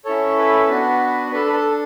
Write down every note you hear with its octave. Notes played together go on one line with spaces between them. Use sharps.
C#4 E4 A4 C#5
B4
B3 D4 F#4
D4 A4 B4
B4
A4